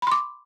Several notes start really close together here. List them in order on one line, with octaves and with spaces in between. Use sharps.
B5 C6 D6